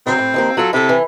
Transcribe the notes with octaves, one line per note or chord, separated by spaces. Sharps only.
C#3 F#3 C4
A2
D#2 F3 A#3
F#3 F4 A4
C3 E4 A4
E3